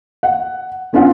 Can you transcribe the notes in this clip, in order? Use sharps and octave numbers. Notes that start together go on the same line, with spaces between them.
F#5
B3 C#4 D4 F4 F#5